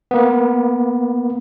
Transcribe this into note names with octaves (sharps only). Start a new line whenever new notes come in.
A#3 B3